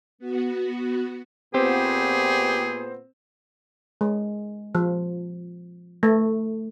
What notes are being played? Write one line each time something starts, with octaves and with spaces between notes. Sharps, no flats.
B3 F#4
A#2 B3 C4 G4 G#4 C5
G#3
F3
A3